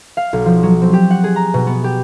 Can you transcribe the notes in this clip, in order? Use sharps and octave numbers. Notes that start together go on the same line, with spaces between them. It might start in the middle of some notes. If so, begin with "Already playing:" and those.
F5
B1
F3
F#3
C4
G4
F#5
G#4
A#5
B2
B3
G4